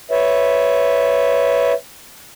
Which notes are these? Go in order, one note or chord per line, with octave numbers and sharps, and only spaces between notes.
B4 C#5 E5